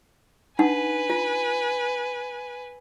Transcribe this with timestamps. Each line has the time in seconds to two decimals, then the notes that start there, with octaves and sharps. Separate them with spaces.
0.59 D4 D#4 B4 F#5 G#5
1.10 F4